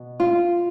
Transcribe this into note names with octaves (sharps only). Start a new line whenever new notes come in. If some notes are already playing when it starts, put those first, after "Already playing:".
Already playing: B2
F4